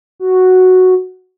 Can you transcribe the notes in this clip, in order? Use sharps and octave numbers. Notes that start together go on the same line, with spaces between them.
F#4